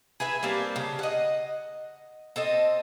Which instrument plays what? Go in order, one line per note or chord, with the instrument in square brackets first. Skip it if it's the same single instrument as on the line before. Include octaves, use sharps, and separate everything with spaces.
[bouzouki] G#4 B4 E5 G#5
G3 A#3 C4 D4
C#3
D#5 F#5
C4 A4 D#5